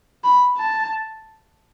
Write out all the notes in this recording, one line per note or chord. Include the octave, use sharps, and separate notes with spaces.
B5
A5